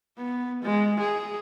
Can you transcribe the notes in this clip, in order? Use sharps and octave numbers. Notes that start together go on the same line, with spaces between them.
B3
G#3
G#4